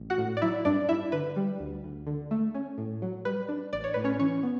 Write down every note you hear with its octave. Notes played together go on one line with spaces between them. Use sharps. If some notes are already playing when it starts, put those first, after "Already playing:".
Already playing: A1
F#4 F#5
A2
D5
F#3 E4 E5
G2 D4 D5
G2 E4 E5
D3 B4
G3
D2
D2
D3
A3
C#4
A2
F#3
G3 B4
D4
A1 D5
C#5
A2 B4
C#4 C#5
E3 C#4 C#5
B3